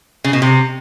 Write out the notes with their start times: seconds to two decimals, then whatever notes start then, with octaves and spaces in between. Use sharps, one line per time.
0.24 C#3
0.33 B2
0.42 C3